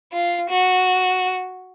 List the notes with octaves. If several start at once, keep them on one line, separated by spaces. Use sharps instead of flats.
F4
F#4